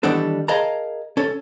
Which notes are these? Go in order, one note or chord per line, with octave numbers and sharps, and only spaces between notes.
D#3 E3 G3 B3 D4 A4
G#4 A#4 D#5 F5 A5 A#5
C#4 A4